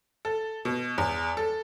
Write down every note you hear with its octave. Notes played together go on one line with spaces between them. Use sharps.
A4
B2
E2
A4